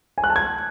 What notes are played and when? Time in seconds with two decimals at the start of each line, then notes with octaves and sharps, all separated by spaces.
0.18 G#5
0.24 F#6
0.30 A5
0.36 G#6